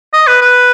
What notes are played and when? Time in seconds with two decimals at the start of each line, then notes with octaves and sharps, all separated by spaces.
0.14 D#5
0.27 B4
0.42 B4